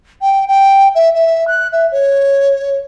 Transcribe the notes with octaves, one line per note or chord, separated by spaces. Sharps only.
G5
G5
E5
E5
F#6
E5
C#5